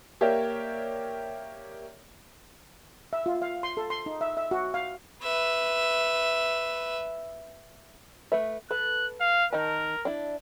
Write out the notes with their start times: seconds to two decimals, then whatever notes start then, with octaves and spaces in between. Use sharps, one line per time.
0.21 A#3 G4 A#4 C#5 D5 E5
3.13 E5
3.26 F4
3.42 F5
3.63 C6
3.77 A4
3.90 C6
4.06 D#4
4.21 E5
4.37 E5
4.51 F#4
4.74 F5
5.23 B4 E5
8.32 A3 B4 E5
8.71 A4 B4 F#6
9.20 F5
9.53 D#3 A#4 D#5 A5
10.05 D4 E4